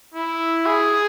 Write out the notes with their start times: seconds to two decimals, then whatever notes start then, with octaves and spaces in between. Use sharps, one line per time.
0.15 E4
0.66 G#4